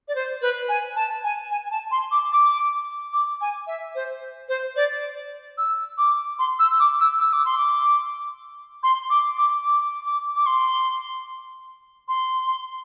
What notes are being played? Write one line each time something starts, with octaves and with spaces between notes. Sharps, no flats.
D5
C5
B4
G#5
A5
G#5
G#5
G#5
A5
C6
D6
D6
D6
G#5
E5
C5
C5
D5
E6
D6
C6
E6
D6
E6
E6
D6
C6
D6
C6
D6
D6
D6
D6
D6
C6
C6